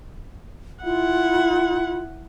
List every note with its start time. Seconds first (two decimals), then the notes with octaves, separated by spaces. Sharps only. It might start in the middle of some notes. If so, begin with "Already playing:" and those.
0.84 E4 F4 F#5